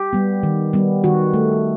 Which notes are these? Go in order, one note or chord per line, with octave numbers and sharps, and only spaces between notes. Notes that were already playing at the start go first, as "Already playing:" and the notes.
Already playing: G4
G3 B3
D#3
G3 B3
D#3 F#4
A3